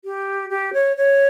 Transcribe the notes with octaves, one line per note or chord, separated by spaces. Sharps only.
G4
G4
C#5
C#5